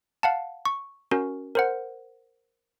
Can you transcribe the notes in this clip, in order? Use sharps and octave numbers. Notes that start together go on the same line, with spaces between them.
F5 F#5 A5
C#6
C#4 F#4 A#4
A#4 C5 F#5